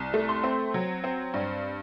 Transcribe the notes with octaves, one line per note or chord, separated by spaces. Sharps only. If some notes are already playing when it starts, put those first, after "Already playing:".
Already playing: C2
A3
C6
C4
F#3
C4
G2